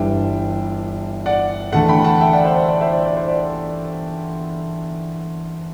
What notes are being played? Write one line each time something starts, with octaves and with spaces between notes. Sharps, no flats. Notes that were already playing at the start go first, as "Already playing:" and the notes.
Already playing: G1 G2 E3 G3 D4 E5 G5
D5 F#5
E2 D3 A3 F#5 A5
G5 B5
F#5 A5
E5 G5
D5 F#5
C5 E5
D5
D5
C5 E5
D5
D5
C5
D5